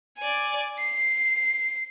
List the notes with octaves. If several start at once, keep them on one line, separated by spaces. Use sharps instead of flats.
D5 G#5
C7